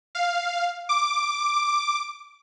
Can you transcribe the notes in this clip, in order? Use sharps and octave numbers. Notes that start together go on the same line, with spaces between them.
F5
D6